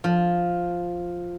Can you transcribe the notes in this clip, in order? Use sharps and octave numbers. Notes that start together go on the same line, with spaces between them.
F3